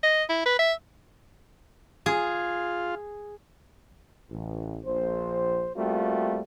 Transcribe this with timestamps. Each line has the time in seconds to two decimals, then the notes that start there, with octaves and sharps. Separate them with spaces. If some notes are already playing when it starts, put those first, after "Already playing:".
0.03 D#5
0.30 E4
0.46 B4
0.59 E5
2.06 F4 G#4
4.31 A1
4.85 A#1 C5
5.76 G3 A3 A#3 C4 F4 F#4